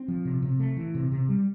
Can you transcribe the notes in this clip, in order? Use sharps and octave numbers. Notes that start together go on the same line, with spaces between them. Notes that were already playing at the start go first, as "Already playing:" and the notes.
Already playing: C4
F3
C3
C3
A3
E3
C3
C3
G3